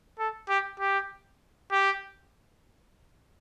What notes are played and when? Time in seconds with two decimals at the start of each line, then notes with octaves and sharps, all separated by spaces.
0.19 A4
0.49 G4
0.80 G4
1.72 G4